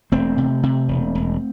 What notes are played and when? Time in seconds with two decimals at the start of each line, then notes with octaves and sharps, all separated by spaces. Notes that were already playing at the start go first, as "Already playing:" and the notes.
0.12 E1 A3 C4
0.38 C3
0.63 C3
0.88 E1
1.15 E1